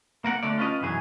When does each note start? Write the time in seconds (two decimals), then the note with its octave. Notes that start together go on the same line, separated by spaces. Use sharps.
0.24 A#3 A#4 F#5
0.43 D2 D3 A3 D5
0.58 C#4 F4 B4 D#5
0.81 B1 F#2 E3 F#3 G#4